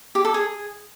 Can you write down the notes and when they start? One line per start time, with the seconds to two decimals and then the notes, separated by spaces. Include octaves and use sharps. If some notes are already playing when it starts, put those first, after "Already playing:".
0.15 G4
0.25 A4
0.34 G#4